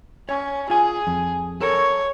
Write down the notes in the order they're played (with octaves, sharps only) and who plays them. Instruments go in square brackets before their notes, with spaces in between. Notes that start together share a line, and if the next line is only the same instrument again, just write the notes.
[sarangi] C#4 [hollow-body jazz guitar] C#5
[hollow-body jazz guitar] F4 G#5 [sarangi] G#4
[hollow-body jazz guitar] F2
[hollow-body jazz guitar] A4 A#4 [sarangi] C#5